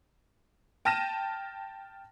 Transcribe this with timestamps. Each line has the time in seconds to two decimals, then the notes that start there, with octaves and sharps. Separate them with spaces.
0.85 G5 A5 F6 A#6 D#7 E7